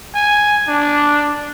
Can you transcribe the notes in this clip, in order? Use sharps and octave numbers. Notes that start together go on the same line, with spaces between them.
G#5
D4